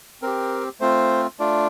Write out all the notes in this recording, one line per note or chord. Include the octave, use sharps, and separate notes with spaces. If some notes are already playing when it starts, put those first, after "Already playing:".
C4 G4 A#4
A3 C4 F4 C5
A3 D4 F4 D5